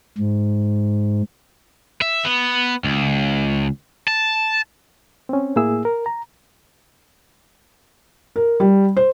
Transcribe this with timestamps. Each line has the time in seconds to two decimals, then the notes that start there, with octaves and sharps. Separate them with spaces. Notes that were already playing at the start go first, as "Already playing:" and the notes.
0.18 G#2
2.02 E5
2.25 B3
2.84 C#2
4.08 A5
5.29 C4 C#4
5.56 A2 A#3 E4 G#4 E6
5.85 A#4
6.06 A#5
8.36 A#4
8.60 G3
8.97 C5